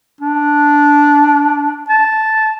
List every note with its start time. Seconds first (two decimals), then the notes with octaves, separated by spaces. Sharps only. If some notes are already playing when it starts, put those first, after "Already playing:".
0.21 D4
1.89 A5